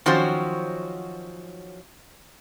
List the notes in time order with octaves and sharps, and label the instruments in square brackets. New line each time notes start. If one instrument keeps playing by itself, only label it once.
[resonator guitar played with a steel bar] D#3 F3 F#3 C#4 F#4 C5